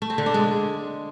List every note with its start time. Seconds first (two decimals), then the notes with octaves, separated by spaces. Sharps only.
0.02 A3
0.10 C4
0.18 D3
0.26 D4
0.34 G#3